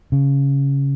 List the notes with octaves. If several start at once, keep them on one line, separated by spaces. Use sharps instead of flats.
C#3